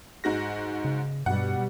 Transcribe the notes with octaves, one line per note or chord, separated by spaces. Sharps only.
G#2 F#4 A#6
C#3
G2 B2 G3 F#5